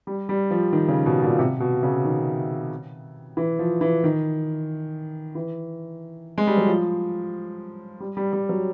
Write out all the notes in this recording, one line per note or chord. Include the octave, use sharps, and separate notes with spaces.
G3
G3
F3
D#3
C#3
B2
A#2
C3
B2
C#3
D#3
E3
F3
E3
D#3
E3
G#3
G3
F#3
F3
G3
G3
G3
F#3